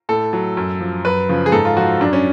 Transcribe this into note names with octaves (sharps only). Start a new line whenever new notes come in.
A2 A4
F#3
F#2
F3
F#2 B4
C#3 F3
G#4
G#2 A4
F4
F3 F#4
F#2 D4
C#4